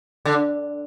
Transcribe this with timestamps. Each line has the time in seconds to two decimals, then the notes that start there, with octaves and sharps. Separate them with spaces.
0.25 D3